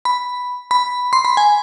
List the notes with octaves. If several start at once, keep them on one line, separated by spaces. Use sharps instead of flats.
B5
B5
C6
B5
G#5